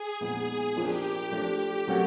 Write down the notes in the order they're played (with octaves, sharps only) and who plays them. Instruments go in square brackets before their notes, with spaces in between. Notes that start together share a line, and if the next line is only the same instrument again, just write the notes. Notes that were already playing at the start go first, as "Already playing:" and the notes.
Already playing: [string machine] G#4
[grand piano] A#2 F3 G#3 B3 D#4
[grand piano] F3 A#3 D4 F4 G#4 [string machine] G4
[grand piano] F3 A3 D4 F4
F#3 A3 C#4 F#4 A#4